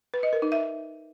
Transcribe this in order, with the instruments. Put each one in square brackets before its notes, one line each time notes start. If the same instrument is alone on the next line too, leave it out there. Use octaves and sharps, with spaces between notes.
[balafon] B4
D#5
A#4
D#4
E5